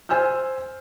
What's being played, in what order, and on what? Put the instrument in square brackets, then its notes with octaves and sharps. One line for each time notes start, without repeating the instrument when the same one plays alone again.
[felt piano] C5 G#5 E6 F6 G6